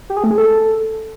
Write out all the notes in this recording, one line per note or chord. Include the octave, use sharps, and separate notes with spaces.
G4
G#4
A3
G#4
A4